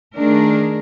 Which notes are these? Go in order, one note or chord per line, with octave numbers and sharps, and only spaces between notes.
D#3 A3 D4 G#4 A#4